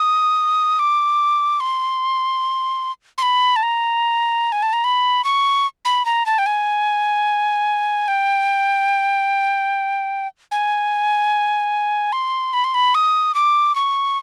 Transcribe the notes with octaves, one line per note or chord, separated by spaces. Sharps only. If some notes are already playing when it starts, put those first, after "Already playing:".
Already playing: D#6
D6
C6
C6
B5
A5
A#5
G#5
A5
A#5
B5
C#6
B5
A#5
A5
G5
G#5
G5
G#5
C6
B5
C6
B5
D#6
D6
C#6